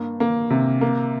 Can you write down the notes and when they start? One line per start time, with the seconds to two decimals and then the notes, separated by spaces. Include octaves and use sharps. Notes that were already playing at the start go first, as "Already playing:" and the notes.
Already playing: G2 A#3
0.20 A#3
0.50 C3
0.81 A#3